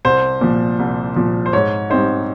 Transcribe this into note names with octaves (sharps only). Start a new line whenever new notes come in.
C2 C5
A#2 F3
C2
A#2 F3
C5
G#2 C#5
G3 C4 D#4 C5